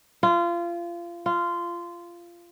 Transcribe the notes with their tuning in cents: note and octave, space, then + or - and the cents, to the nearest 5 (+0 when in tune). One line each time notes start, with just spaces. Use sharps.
F4 -25
F4 -15